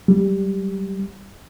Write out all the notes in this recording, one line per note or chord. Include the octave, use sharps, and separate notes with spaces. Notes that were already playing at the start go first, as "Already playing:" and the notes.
G3